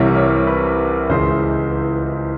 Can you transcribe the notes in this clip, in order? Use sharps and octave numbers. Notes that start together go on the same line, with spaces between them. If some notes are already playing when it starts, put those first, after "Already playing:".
Already playing: C2 C3 E3 G3 A#4 C#5
C#5
B4
C#2 C#3 E3 G#3 C5